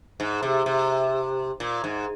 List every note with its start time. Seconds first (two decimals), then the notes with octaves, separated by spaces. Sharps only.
0.20 G#2
0.43 C3
0.66 C3
1.60 A#2
1.84 G#2